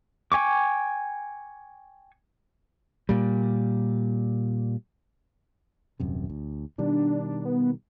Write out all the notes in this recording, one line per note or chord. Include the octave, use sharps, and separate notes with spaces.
G5 G#5 C#6 D6
A#2 G3
D#1 F#2 C3
D2
B2 D#3 G3 D4
B3